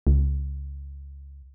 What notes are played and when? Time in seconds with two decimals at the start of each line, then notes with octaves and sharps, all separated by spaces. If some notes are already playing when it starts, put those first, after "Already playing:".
0.07 C#2